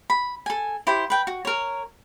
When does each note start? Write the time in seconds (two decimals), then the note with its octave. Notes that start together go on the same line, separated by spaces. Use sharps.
0.10 B5
0.46 A4 G#5
0.87 E4 G4 C5
1.10 B4 G5
1.27 F#4
1.45 A#4 C#5